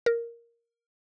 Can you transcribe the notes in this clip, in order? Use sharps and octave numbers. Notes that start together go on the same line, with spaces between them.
A#4